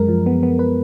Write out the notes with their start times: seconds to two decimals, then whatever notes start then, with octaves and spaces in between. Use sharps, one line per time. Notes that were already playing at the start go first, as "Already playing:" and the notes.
Already playing: F#2 G#3 A#4
0.08 F3
0.26 B3
0.43 B3
0.59 B4